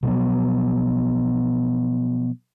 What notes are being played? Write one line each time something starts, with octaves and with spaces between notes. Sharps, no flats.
B2 F3 F#3 B3